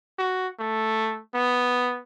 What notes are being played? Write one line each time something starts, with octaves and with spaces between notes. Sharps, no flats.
F#4
A3
B3